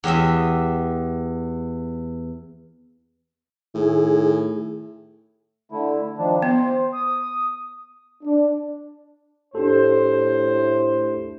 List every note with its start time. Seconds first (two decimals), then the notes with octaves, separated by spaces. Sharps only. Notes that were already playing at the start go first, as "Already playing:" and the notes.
0.04 E2 G4 D#5 E5
3.75 A2 D#3 G#4
5.72 D3 A3 E4
6.18 D#3 F3 D4
6.42 B3 C5
6.93 D#6
8.24 D4
9.55 A2 D4 G4 A4 C5